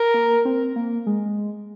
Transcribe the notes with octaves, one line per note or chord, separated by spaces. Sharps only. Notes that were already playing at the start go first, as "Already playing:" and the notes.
Already playing: A#4
A#3
C4
A#3
G#3